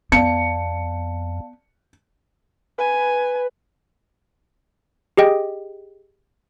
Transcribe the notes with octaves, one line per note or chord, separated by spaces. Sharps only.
F2 B3 D5 F5 A5 C#7
B4 G#5
G4 G#4 D#5 G5